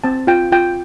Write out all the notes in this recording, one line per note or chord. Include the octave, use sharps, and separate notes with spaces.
C4 A5
F4 G5
F4 G5